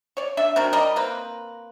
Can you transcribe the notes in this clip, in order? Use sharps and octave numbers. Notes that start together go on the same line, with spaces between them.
C#5 D5
D4 D5 E5
C3 D4 F#4 A#4
G3 A#4 D5 D#5
A#3 C4 A#4 B4